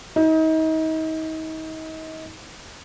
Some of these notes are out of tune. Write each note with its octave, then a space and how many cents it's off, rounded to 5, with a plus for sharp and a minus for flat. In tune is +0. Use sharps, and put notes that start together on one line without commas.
D#4 +35